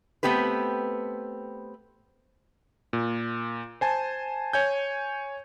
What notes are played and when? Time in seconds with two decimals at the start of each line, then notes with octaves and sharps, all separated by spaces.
0.23 A3 B3 C4 G4 B4
2.93 A#2
3.81 C5 G#5 A5
4.53 C#5 G#5 G6